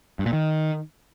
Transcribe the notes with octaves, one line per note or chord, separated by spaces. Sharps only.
G2
A#2
D#3